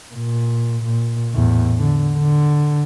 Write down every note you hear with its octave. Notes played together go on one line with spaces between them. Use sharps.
A#2
A#2
E2 A2
D3
D3